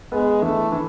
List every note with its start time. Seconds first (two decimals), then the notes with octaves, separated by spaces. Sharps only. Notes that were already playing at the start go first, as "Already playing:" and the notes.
0.12 G#3 B3
0.42 E3 A3
0.72 E3